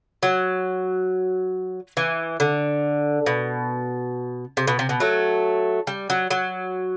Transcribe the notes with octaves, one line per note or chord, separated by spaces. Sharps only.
F#3
E3
D3
B2
C3
B2
C3
B2
F#3 A3
G3
F#3
F#3